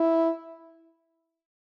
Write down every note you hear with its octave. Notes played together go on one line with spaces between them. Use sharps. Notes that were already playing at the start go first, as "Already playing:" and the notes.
Already playing: E4